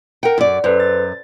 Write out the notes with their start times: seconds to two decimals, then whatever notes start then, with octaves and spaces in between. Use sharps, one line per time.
0.23 A#4 F#5 G5
0.38 F#2 D5
0.64 F#2 A4 B4 C5
0.80 A6